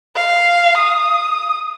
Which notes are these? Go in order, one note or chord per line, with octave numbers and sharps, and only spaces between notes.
F5
D#6